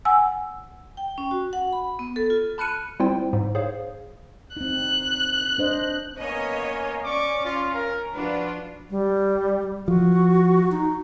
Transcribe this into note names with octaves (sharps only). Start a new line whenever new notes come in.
F#5 G#5 E6
G5
C#4
F#4
F#5
B5
B3
A4
F4
A5 B5 F6 F#6 C#7 D#7
G3 C4 E4 F4 C5 G5
G#2
G#4 C5 C#5 F5
C4 D#4 F#6
D4 C5 D#5
A#3 B3 C#4 C#5 D#5
C#4 D5 C#6 D6
F4
A#4
F3 D4 F4 F#4 B4
G3
F3 F#4
D#4